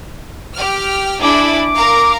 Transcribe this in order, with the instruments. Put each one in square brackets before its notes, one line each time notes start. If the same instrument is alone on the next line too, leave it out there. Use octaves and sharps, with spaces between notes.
[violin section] G4 F6
[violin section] D4 E4 G#4 [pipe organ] D6
[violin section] A#4 F5 A#5